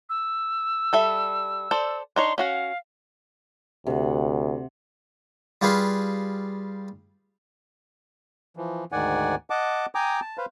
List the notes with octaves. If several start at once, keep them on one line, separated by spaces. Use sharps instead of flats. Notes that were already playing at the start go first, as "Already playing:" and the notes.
E6
G3 A4 E5
A4 C5 D5
D4 D#4 C#5 C6
C#4 F#4 F5 F#5
D2 C3 F#5
G3 F4 G4 G#4 B4 F5
E3 F3
D2 G#2 D#3 D5 F#5 G#5
D#5 F#5 A5 D6
G5 G#5 A#5 D6 D#6
A5
B4 C5 F5